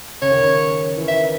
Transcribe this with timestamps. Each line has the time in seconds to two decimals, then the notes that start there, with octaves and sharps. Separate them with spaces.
0.22 C#3 C#5
0.30 D#3
0.40 C#3
0.97 E3
1.08 D#3 E5